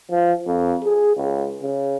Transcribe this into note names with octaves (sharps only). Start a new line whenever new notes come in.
F3
F2
G#4
C#2
C#3